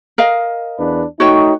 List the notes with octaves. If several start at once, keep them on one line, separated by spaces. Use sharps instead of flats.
A#4 D#5 F5
E2 D4 B4
A3 D#4 F#4 C#5 G5 C#6